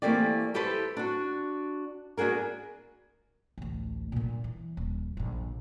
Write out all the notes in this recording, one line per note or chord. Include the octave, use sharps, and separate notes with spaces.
E3 A3 A#3 C4 G4 D5
E4 G4 A4 B4 C5
D4 F#4
B3 D4 F#4 G#4 A#4
A1 D2
A#2 D3
E3
D#1
A#1 D3